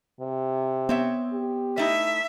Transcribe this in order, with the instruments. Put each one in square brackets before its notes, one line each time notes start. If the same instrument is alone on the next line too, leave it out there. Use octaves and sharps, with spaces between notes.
[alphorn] C3
[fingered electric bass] B3 [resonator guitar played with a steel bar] C4 C#5 E5
[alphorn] G4
[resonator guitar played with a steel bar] A3 D#4 E4 [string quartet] E5